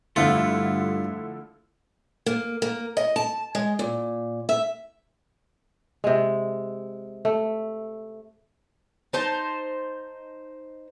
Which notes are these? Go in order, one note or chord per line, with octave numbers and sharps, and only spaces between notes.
G2 D3 F3 A3 E4 F4
A#3
A#3
D#5
A5
G#3
A#2
E5
C3 G#3
A3
D#4 C5 A5